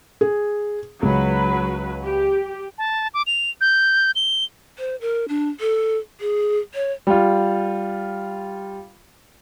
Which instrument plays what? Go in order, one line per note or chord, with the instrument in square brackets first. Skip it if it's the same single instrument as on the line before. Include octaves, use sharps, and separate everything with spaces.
[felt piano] G#4
[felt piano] C#2 [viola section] F#3 B4
[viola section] G4
[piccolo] A5
D6
F7
G6
G7
[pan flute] C5
A#4
D4
A4
G#4
C#5
[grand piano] G3 F4